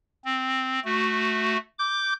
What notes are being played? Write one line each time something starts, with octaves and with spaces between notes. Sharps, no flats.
C4
A3 F#4
D6 G6